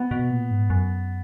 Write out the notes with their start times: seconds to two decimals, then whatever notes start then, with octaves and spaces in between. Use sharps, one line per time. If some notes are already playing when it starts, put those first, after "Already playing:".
Already playing: B3
0.11 B2
0.30 A#2
0.50 G#2
0.70 F#2